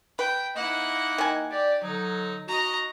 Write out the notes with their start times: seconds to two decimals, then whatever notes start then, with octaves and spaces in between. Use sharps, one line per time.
0.19 B4 G5
0.56 A#3 D#4 E4 D#5 F#5
1.18 D#3 G#5
1.51 G4 D5
1.83 D3 F#3 D#4
2.48 F#4 D#5 A#5